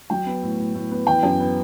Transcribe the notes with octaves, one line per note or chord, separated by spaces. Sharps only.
F#3 G5
B3
A2
A2
A2
B3
E3 G5
F#2
B3